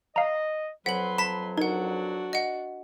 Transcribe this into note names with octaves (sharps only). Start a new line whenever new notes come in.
D#5 F5 A#5
F2 F#3 B4 F#5 C6 B6 F#7
A5 B5 B6 E7
D4 D#4 F#4 A#4 F#5
D#5 F#5